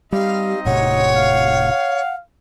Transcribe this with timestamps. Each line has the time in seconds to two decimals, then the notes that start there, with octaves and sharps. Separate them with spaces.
0.12 G3 C4 D#4 G4 D#5 F5
0.65 D#1 A2 C3 C#5 F#5
1.15 F5